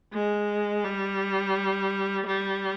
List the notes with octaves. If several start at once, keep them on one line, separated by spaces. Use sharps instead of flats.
G#3
G3
G3